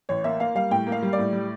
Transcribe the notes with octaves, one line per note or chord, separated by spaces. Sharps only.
A1 C#5
A#3 E5
A#3 F5
G3 F5
A2 G5
A#3
F5
G3
D5
A2
G3